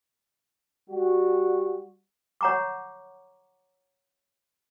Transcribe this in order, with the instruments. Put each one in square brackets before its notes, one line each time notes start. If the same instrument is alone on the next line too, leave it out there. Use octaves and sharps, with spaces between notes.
[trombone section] G3 F#4
[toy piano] C#5 F#5 A#5 C#6 D6